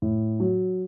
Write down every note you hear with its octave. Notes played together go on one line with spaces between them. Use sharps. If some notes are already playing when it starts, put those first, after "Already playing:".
A2
F#3